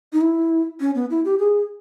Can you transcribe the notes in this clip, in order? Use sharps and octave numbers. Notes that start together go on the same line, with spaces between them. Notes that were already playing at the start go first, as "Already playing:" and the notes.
D#4
E4
C#4
B3
E4
G4
G#4